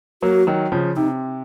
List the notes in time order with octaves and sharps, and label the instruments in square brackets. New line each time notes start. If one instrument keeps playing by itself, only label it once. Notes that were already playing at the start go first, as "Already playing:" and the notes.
[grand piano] F#3 A#3 [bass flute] F#4
[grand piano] D#3 F#3
C#3 F3
[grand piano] C3 [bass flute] D#4